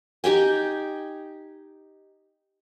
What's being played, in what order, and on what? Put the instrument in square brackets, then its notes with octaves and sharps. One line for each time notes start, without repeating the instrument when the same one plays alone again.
[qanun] D#4 G4 G5 G#5